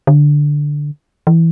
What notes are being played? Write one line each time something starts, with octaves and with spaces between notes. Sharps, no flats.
D3
E3